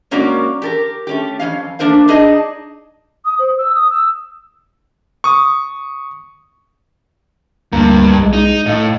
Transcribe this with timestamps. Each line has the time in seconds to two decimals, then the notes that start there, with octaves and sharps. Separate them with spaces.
0.11 G#2 A#3 C#4 F#4 A#4 D5
0.62 G4 A4 A#4
1.07 A3 C#4 G4
1.39 F2 F3 C#4 F5
1.79 A3 A#3 D4 A#4 C5 F5
2.08 D4 D#4 G#4 D#5
3.25 D#6
3.38 C5
3.58 E6
3.74 D#6
3.90 E6
5.24 C#6 D#6
7.72 D2 G2 A#3 A#5
8.19 B1 G#3
8.33 D#4
8.66 A2 D#5 F5